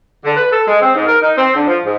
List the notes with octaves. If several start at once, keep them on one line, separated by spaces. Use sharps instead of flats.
D3
B4
A4
G#3
C4
G#2
A#4
D#4
C4
D3
F3
G#2